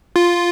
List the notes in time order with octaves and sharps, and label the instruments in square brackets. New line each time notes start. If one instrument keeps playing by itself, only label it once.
[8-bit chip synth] F4